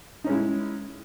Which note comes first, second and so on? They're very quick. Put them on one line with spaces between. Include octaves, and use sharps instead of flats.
D#4 C#4 G#3 E4